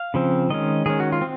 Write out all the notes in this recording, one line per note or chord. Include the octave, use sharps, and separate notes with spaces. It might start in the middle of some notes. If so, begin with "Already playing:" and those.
Already playing: F5
C#3 F3 C4
D#3 G#3 C#4 D#5
D#3 G#3 C#4 G#4
F#4
F4
C4